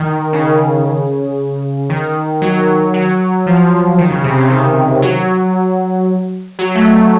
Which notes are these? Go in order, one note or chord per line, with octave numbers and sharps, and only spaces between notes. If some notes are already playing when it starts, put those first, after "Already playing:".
Already playing: D#3
C#3
D#3
F#3
F#3
F3
D#3
C#3
C3
C#3
D#3
F#3
F#3
A3